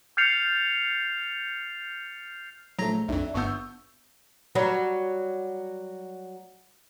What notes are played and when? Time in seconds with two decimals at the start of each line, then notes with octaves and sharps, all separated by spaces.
0.17 F6 G6 A6 C7 C#7 F7
2.79 A#1 F#3 A3 A#5 A#6
3.08 B1 F2 D4 E5
3.34 G1 G2 B3 C#6 E6 G6
4.55 F#3 G3